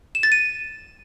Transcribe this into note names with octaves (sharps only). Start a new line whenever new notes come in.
E7
A6
D#7